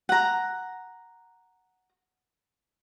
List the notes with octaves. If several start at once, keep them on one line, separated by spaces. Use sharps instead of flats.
F#5 A#5